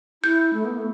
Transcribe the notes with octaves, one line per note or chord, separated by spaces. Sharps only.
E4 G6
A3
B3
A3